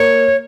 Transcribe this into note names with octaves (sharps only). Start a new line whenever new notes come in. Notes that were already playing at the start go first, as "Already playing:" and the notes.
Already playing: A#3 C#5